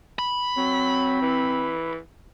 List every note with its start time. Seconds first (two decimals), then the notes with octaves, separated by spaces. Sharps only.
0.19 B5
0.57 F#3 C4
1.22 E3